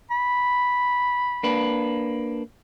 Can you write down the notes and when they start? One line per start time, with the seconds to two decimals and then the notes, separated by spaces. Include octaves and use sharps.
0.10 B5
1.43 A#3 D4 B4